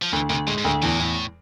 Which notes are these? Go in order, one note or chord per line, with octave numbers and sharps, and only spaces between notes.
F3
D2 E3
D2 C3
A2 G#3
G#2
D2 A2
E2 A2
E2